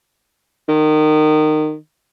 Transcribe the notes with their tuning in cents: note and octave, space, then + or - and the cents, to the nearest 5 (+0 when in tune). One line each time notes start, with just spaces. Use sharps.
D#3 -20